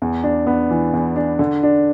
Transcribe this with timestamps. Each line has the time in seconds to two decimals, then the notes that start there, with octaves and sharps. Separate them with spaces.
0.02 E2
0.24 D4
0.47 B3
0.71 E3
0.94 E2
1.16 D4
1.39 D3
1.63 D4